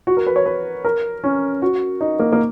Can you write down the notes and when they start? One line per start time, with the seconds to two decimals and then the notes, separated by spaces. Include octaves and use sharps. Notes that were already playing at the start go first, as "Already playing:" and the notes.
0.07 F#4
0.17 A#4
0.27 B4
0.36 C#5
0.46 B4
0.85 A#4
1.24 C#4
1.62 F#4
2.01 D#4
2.19 A#3
2.32 A#3